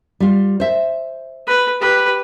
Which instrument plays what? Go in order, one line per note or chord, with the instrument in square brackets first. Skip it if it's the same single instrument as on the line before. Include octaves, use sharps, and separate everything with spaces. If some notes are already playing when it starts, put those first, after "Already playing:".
[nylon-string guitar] G3 F4
C5 E5
[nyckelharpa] B4
G4 B4